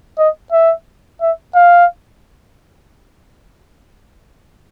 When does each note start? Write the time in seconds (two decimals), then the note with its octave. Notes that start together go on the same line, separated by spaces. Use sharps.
0.18 D#5
0.52 E5
1.21 E5
1.55 F5